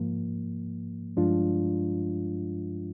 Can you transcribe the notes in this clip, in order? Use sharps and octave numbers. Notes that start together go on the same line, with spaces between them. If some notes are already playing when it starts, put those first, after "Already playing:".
Already playing: G#2 F3 A#3
G2 F3 G#3 D4 F4